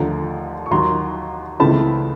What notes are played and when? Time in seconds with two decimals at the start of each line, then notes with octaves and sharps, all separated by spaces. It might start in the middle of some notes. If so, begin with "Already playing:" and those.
Already playing: D#2 D3 F3 A3 A#5
0.66 C#6
0.71 D#2 D#3 F#3 A#5 C6
1.60 C#2 C#3 E3 A3 C4 A5 B5